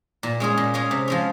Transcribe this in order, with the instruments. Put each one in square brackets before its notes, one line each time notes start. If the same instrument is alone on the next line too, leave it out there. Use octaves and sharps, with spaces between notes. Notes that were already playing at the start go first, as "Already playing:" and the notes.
[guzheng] A#2
G#3 C#4 G#4
A#2
G#3 C#4 G#4
C3
F3 G#3 C#4